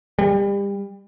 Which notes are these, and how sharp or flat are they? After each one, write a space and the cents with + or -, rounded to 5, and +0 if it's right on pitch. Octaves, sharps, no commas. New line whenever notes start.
G3 +30